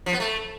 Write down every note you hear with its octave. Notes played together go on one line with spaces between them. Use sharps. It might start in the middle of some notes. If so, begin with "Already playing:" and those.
F3
B3
A3